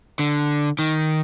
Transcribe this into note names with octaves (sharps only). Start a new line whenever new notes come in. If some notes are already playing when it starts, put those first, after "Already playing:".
D3
D#3